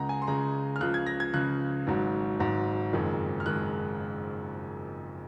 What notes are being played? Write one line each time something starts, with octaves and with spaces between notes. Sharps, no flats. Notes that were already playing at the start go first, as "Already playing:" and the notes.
Already playing: C#2 C#3 G#3 F#5 A#5
G#5
C6
C#2 C#3 G#3 A#5
F6
C#2 C#3 F3 F#6
G#6
A#6
G#6
C#2 C#3 F3 F#6
G#1 G#2 F#3
G#1 G#2 F#3
F#1 F2 D#3 G#3
F6
D#3 G#3 F#6